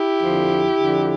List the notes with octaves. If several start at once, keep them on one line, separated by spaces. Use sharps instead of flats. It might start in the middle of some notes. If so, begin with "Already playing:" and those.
Already playing: E4 G4
F2 D3 F3
F2 D3 F3